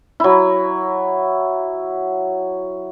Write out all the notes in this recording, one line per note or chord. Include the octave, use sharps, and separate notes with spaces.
F#3 E4